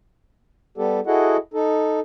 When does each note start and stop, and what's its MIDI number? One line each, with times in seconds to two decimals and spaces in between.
0.78 1.00 55
0.78 1.00 59
0.78 1.00 67
0.78 1.00 69
1.07 1.37 64
1.07 1.37 66
1.07 1.37 68
1.07 1.37 69
1.07 1.37 75
1.07 1.37 78
1.54 2.00 63
1.54 2.00 69